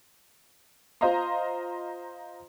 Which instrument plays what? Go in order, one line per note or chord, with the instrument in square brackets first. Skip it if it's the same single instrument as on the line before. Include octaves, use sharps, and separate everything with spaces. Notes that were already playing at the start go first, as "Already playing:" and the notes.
[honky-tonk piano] F4 C5 D#5 F5 A#5 C6